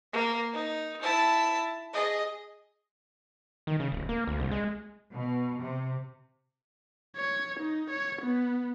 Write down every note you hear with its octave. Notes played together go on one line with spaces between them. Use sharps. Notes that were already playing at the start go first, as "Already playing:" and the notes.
A#3
D#4
E4 A5
G#4 D#5
D#3
C#3
D1
A#3
D2
C2
G#3
B2
C3
C#5
D#4
C#5
B3